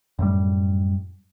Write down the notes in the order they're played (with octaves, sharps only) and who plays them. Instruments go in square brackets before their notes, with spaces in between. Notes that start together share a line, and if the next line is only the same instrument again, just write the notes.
[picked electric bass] F#2 A2 G3